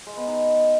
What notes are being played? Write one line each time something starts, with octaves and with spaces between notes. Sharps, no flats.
G#3
B3
D#4